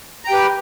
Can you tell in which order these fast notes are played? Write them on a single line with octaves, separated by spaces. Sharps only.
A#5 G5 G4 B4